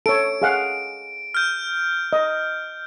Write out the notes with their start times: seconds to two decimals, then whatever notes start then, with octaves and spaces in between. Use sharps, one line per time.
0.06 A4 C#5 D7
0.42 G#4 F5 F#5
1.34 F6 G6
2.13 D#5